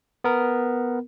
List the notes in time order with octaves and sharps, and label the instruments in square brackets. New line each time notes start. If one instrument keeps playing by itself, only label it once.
[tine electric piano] B3 A#4